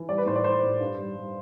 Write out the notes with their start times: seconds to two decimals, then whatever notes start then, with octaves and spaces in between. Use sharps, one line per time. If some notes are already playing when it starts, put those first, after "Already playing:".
Already playing: E3
0.09 G3 D5
0.18 B4
0.26 A2 C5
0.36 D5
0.44 A2 C5
0.63 A2
0.80 G2
0.98 G3
1.16 G3